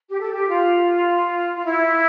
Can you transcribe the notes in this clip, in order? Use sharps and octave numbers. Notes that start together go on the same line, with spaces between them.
G4
A4
G4
F4
F4
E4